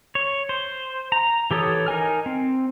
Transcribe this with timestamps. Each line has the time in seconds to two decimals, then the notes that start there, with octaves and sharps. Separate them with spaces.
0.15 C#5
0.49 C5
1.12 A#5
1.51 E3 G4 A4 C#5 D#6
1.87 D#4 A#4 G#5 F6
2.26 C4